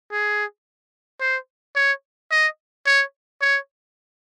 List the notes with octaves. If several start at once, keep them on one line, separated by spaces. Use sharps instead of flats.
G#4
C5
C#5
D#5
C#5
C#5